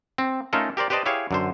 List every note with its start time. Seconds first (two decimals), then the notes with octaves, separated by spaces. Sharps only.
0.18 C4
0.53 A3 C#4 D#4 F4 A4 A#4
0.77 G4 A#4 C5 D5
0.90 G4 B4 C5 D5 D#5 A5
1.06 E4 G4 G#4 C#5 F5
1.31 F#2 D3 C5